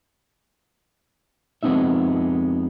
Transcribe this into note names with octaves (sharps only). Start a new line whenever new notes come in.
F2 G#3 B3 C4 D#4 E5